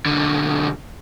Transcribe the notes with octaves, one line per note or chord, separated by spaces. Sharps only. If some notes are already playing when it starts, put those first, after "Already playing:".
B1 D3